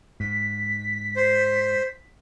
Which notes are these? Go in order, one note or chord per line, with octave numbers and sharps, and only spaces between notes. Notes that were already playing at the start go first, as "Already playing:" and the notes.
G#2 B6
C5